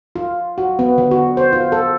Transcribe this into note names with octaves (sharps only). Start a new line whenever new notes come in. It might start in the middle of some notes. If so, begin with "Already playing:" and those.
F4
F#4
B3
D3
F#4
C5
F4
A4